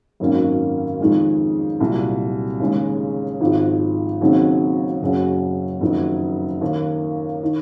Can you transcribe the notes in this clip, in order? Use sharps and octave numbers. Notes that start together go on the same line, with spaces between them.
G#1 F#2 D#3 A#3 C#4
F2 D#3 G#3
C2 A#2 F#3
D#2 C#3 G#3 C#4
G#1 G#2 F3
D#2 C#3 F#3 C4 D#4
F#1 F#2 C#3 F#3
F#1 F2 D#3 F#3
D#2 D#3 A#3
D#3